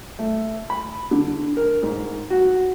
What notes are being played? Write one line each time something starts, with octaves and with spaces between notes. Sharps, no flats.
A3
B5
D3
A#4
G#2
F#4